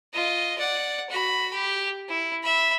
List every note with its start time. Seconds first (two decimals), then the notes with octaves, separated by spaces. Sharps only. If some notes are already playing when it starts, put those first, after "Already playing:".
0.13 F4 D#5
0.58 D5 F#5
1.10 F#4 B5
1.53 G4
2.09 E4
2.43 E5 B5